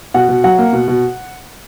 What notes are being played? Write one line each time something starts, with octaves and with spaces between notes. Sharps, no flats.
B2 F#5
B2
F#3 F#5
A#3
B2
B2